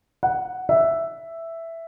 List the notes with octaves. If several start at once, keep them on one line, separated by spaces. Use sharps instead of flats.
F#5
E5